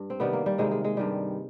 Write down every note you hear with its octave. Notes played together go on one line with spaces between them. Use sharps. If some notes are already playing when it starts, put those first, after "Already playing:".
Already playing: G2
C4
C3 D#3 G3 B3
A#3
G3
C3 D#3 G3 G#3
G#3
G#3
G2 D#3 G3